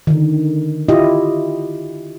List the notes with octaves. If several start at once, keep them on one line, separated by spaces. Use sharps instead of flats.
D3 D#3
E4 F4 G4 D#5